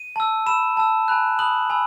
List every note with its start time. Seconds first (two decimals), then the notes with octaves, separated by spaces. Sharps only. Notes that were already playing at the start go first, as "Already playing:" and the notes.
Already playing: D#7
0.16 A5 E6
0.46 B5 E6 E7
0.77 A5 E6
1.08 G#5 B5 F#6
1.39 B5 D#6 F#6 F#7
1.70 G#5 B5 E6